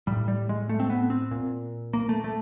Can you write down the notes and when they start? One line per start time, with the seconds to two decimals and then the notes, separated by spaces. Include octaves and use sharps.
0.07 A2 G3
0.28 G3
0.49 G#3
0.69 A3
0.80 C4
0.90 B3
1.10 C4
1.31 A#2
1.93 A#3
2.09 A3
2.24 A3